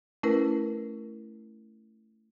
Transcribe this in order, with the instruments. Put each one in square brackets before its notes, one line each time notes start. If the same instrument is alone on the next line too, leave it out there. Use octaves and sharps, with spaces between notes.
[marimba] A3 C#4 E4 A#4 B4